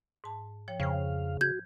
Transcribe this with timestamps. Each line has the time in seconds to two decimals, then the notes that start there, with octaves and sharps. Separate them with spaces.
0.24 G#2 A5
0.68 F3 C#5 G5
0.80 F2 C#3 C5 F5 G5
1.41 F#4 G6 G#6